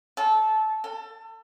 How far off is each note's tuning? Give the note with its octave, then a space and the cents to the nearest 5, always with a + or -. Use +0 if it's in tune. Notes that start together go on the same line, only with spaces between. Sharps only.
A4 -20
A4 +25